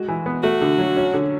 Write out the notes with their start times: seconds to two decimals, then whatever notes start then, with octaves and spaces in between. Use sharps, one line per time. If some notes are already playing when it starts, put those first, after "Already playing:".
Already playing: G#3 F#4
0.08 E3
0.26 B3
0.43 A3 F#4
0.61 D3
0.79 F#3
0.97 C#4
1.13 D3